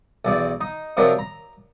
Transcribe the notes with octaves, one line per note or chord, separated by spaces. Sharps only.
B1 E2 D5
D#4
C3 F3 F#3 D4 A#4
A#5